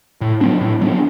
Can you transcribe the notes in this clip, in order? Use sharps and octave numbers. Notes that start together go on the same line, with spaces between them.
A2
F#3 B3 D4
A2
F#3 B3 D4